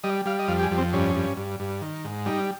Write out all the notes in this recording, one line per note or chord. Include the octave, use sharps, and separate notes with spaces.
G3 D#5
G3 F5
D#5
F2 F5
G4
G#4
F2
C4
G2 C#4
G2
G2
G2
D#3
G#2
G3 D#4